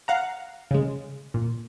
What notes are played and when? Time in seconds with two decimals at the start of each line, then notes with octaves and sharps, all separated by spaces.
0.08 F5 F#5 A#5
0.71 C#3 G#3
1.34 A#2